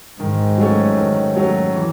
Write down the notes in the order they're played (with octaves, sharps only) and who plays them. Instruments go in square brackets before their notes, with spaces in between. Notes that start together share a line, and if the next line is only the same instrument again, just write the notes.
[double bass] G#2 [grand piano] D#3
[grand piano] F#3 A3 C#4
D#3
F#3 A3 C#4
E3